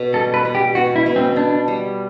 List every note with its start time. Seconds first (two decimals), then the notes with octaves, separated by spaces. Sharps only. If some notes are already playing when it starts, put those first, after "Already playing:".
Already playing: B2
0.13 G3 A4
0.34 B4
0.45 B2
0.55 G4
0.75 B2 F#4
0.96 E4
1.06 B2
1.16 C4
1.36 B3 D4
1.68 G3